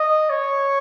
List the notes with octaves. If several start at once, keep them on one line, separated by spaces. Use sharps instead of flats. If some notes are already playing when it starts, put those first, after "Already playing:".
Already playing: D#5
C#5